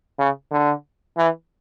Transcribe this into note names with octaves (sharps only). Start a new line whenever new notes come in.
C#3
D3
E3